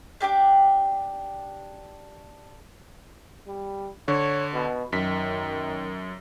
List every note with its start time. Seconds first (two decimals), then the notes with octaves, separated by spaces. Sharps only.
0.20 D4 G4 G5 D6
3.47 G3
4.08 D3 C#5
4.54 B2
4.92 F#2 D#3 B6